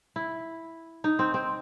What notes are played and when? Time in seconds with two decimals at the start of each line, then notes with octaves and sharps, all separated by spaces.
0.16 E4
1.04 D#4
1.19 C4
1.34 C4